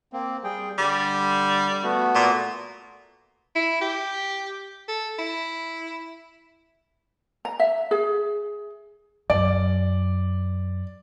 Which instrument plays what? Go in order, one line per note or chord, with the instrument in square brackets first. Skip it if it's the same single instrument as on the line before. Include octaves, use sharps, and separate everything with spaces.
[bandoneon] A#3 C4
G3 G#4 G5
[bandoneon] D3 [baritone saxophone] G3
[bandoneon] A3 B3 F#4
[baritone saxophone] A#2
[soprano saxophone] E4
G4
A4
E4
[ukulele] A#5
E5
G#4
[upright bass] F#2 [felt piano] D5